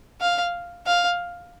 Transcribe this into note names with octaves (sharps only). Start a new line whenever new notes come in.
F5
F5